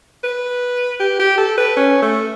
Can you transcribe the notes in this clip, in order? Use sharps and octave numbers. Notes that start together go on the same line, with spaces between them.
B4
G4
G4
A4
B4
C#4
A3